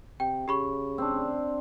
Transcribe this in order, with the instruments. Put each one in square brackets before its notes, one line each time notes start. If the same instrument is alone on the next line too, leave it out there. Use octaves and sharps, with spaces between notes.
[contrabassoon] C3 [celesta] G5
[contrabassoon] C#3 [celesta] G4 B5 C#6
[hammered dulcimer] C4 D4